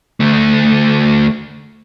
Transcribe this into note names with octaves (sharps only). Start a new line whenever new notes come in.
D2 A3